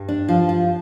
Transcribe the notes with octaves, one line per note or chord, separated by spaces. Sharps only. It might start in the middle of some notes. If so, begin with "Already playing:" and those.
Already playing: G2
D4
F3 F4
F4